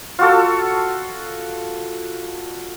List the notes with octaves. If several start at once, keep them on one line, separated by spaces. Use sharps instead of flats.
F4 F#4 A4